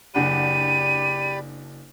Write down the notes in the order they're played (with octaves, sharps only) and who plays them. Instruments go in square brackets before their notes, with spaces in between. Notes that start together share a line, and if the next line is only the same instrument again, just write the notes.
[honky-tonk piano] F#1 D4 F#5 [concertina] G4 D5 B5 [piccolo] D#7